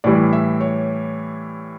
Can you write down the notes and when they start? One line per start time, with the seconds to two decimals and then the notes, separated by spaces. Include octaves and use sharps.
0.04 A2 E3 G3 D5
0.33 E5
0.61 C#5